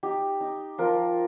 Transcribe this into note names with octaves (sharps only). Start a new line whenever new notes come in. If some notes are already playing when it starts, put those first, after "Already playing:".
D#4 G4
D#4
F3 F4 A#4